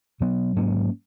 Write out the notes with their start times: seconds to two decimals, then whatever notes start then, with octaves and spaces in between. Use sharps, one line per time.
0.20 B2 F#3 B3
0.56 G#2 F#3 A#3 C#4